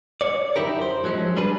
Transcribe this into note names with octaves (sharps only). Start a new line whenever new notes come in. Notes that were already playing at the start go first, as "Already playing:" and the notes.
C#5 D5
F#2 D#3 D#4 E4 G4 A#4
C5
F3 F#3 G#3 C4 C#4
G3 D4 G#4 B4